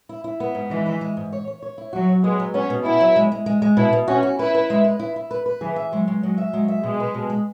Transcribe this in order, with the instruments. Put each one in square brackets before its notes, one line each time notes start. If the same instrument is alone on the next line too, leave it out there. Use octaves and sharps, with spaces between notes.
[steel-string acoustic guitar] E4
E4
B3
G#2
[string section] E3 [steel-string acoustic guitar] G#3
[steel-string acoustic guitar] E4
G#3
G#2
C#5
C#5
C#5
E4
[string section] F#3 [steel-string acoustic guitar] F#4
[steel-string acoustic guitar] F#3
[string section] G#3 [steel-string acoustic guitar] B3
[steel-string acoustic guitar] F#3
[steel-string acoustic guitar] B3 [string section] C#4
[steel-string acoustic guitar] B2
[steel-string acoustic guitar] B3 [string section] E4
[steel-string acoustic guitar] F#3
G#3
G#3
G#3
G#3
[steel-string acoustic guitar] B2 [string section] E4
[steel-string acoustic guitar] B2
[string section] C#4 [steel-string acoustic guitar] F#4
[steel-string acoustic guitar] F#4
[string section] E4 [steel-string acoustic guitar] B4
[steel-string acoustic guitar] B4
G#3
B4
E4
E4
B4
B4
[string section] E3 [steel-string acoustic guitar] G#4
[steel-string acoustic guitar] E5
[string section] F#3 [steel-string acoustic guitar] G#3
[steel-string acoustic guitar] G#3
[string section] F#3 [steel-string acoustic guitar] G#3
[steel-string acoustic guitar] E5
[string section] F#3 [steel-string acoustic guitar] G#3
[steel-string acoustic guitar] E5
[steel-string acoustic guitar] B2 [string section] G#3
[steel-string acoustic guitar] B4
B2
G#3